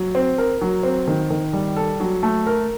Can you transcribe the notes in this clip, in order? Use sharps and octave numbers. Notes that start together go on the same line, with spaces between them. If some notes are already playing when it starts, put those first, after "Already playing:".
Already playing: F#3
C4
A#4
F#3
C4
D#3
D#3
G3
A4
F#3
A3
A#4